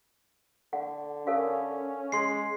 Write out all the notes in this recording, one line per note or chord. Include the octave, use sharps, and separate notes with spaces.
D3 F#5
C#4 A4 A#4 F5
G#3 C6 C7